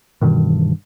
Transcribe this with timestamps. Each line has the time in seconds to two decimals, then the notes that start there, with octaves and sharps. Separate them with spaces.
0.21 G2 B2 D#3 E3